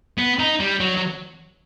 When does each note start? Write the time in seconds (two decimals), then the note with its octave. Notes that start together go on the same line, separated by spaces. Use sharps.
0.18 B3
0.39 D#4
0.60 G3
0.80 F#3
0.97 F#3